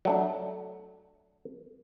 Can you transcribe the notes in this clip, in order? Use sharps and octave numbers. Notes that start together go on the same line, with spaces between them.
F#3 A3 D4